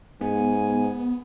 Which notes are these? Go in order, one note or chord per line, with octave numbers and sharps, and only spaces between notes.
G#2 B3 G#5